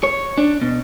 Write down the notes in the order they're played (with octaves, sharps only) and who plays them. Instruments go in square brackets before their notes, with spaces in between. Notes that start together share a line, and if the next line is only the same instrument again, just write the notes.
[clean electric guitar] C#5
D4
B2